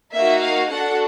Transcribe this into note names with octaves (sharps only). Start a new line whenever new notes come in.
A#3 D#4 F#4 E5
F5
D4 F#4 A4 F#5